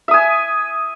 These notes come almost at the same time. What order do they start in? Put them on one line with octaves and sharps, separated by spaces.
E5 D#6 G#5